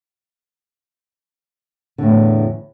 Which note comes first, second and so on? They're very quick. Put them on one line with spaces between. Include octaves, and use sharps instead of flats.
D3 A2 E2